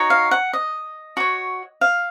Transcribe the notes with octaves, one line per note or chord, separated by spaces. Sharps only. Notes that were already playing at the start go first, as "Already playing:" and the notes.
Already playing: D#4 F#4 C#5
F5
F#5
D#5
F#4 C#5
F5